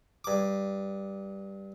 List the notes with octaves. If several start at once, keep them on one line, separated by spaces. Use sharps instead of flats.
G2 D6